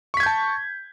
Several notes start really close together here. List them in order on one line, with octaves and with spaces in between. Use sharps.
C#6 B6 G#6 G6 A5